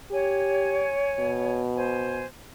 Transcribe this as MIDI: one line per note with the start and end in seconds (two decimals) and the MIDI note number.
0.11 0.90 67
0.11 1.58 73
0.11 1.58 80
1.19 2.24 47
1.75 2.25 72
1.75 2.25 80